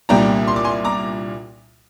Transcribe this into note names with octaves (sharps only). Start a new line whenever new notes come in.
C2 A#2 G3 A#3 D4 G5 A#5
C6
D6
G#5 C6
A#5 D6